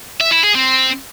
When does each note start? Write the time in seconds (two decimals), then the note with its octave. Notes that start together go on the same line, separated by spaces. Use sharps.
0.21 E5
0.32 E4
0.43 G#4
0.55 C4